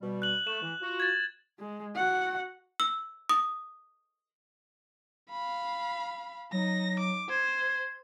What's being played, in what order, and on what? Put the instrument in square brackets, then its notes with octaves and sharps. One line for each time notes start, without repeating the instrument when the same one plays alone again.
[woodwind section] B2 G3
[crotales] F#6 F#7
[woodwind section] A3 [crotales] E7
[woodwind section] E3
F4 F#4
[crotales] G#6 A6
[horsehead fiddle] G#3
F#4 F#5
[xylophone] E6
D#6
[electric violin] F5 B5
[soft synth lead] F#3 [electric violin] D#4 A#6
[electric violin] D6
[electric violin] C5 [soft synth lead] G#6